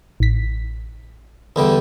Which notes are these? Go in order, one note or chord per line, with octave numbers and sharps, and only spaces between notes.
A1 B6
E2 D3 G3